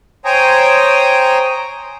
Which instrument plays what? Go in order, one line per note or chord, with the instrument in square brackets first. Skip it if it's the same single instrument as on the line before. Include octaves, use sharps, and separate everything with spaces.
[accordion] C5 C#5 G5 G#5 A#5 D#6